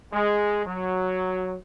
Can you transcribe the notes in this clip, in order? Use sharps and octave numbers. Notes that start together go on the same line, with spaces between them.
G#3
F#3